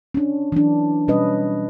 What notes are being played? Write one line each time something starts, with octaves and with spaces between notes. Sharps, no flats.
C#4 D4
E3 F#3 D4
B2 G3 C#4 B4 D#5